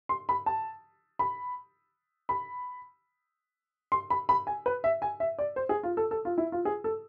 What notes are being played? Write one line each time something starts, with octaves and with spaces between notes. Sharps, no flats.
C6
B5
A5
B5
B5
C6
B5
B5
G#5
B4
E5
G#5
E5
D5
C5
G#4
F4
A4
A4
F4
E4
F4
G#4
A4